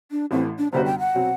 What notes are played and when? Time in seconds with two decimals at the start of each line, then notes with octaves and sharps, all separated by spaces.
0.11 D4
0.31 A1 A2 E3 A3 C4
0.58 D4
0.72 F#2 D3 G3 B3 F#4 C5
0.86 G5
0.99 F#5
1.14 B2 F#3 C4